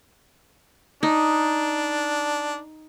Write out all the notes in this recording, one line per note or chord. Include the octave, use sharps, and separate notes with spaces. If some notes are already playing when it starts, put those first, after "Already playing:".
D4 D#4